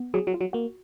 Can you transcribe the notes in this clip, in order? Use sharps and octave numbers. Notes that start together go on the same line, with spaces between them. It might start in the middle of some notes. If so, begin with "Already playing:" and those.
Already playing: B3
F#3 G#4
F#3
F4
F#3
A#3 F#4